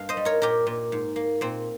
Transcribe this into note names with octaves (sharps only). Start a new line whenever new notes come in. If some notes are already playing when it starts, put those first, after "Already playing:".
Already playing: G2 A#3 F5
C5 D#5
G3
A#4 C#5
A#2 G4 A#4
A#2
G#2
A#3
A#2 C4